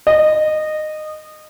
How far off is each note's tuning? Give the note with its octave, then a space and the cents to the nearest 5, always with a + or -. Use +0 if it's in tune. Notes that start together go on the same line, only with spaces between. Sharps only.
D#5 -20